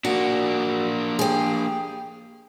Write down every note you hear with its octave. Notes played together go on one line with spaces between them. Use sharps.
A#3 D4 F#4
G4 G#4